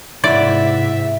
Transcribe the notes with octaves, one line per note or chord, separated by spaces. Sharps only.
G#2 C3 E4 D5 E5 F#5